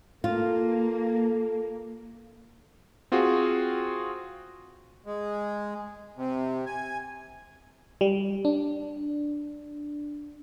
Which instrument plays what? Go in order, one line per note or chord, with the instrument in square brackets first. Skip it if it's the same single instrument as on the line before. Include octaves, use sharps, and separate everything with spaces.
[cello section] A#3 [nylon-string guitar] F4 [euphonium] A4
[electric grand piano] C4 F4 F#4 G#4 F#5
[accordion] G#3
C3
G#5
[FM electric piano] G3
D4